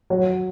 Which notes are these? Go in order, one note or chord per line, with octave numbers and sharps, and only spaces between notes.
F#3